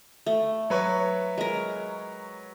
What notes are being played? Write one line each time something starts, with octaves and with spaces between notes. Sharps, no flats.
A3
F#3 B4 C#5
G#3 A#4